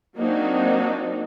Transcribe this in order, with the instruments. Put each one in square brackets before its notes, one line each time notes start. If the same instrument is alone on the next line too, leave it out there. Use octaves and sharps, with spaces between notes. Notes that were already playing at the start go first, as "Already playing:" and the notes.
[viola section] F#3 A#3 C4 D4 D#4 F#4